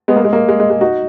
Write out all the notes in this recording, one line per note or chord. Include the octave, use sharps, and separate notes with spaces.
G#3 B3
A#3
G#3
A#3
G#3
G#3
G#3
D#4 F#4